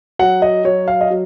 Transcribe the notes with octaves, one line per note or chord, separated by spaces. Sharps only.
F#3 F#5
D#5
F#3 C#5
F5
D#5
F#3